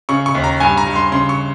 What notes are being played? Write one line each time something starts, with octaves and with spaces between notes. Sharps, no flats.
C#3 C#6
C#6
D#2
A#5
G2 G#5
A#5
G2
C6
C#3 C6
C#6